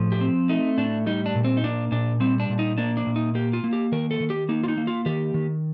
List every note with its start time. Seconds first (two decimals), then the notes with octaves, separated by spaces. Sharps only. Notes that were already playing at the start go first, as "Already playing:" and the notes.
Already playing: A2 F3
0.12 G4
0.21 C4
0.49 A3 D#4
0.78 A2 D4
1.06 G3 D#4
1.26 D4
1.35 A#2
1.45 C4
1.57 D#4
1.64 A#3 D4
1.92 A#2 D4
2.20 G3 C4
2.40 D4
2.49 A#2
2.59 D#4
2.78 A#3 D4
2.97 D4
3.07 A#2
3.16 D#4
3.35 A#3 G4
3.53 F4
3.64 A#3
3.73 G4
3.92 D#3 A#4
4.11 A4
4.20 D#3
4.30 G4
4.49 A#3 D#4
4.64 F4
4.68 D#4
4.78 A#3
4.87 F4
5.06 D#3 G4
5.34 D#3